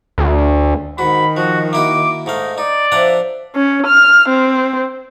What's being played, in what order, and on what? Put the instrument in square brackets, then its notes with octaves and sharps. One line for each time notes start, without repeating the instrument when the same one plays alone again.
[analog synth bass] D2
[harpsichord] G#2 F#4 [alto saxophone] D#3 [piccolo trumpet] B5
[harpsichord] F3 [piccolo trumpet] F#4
[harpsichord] A#3 E4 F#4 [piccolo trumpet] D6
[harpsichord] G#2 A3 F5 [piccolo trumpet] D#4
[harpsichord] D#4 [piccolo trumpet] D5
[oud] F3 [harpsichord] D4 F#5 A#5 [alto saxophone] E5
[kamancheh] C#4
F6
C4